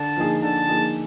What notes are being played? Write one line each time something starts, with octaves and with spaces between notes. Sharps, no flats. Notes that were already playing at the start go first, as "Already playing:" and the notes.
Already playing: D3 A5
F3 A#3 D#4 G#4
D3 A5
F3 A#3 D#4 G#4